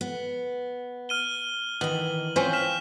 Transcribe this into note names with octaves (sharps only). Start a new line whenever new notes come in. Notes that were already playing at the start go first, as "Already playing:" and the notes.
B3
F6 D#7 G7
D#3 E3 B3 F#7
C4 C#4 F4 C5 B6
F6 B6 E7